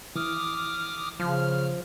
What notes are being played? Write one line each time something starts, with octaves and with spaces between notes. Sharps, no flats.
E3 D6 D#6 F6
C#3 F3 F6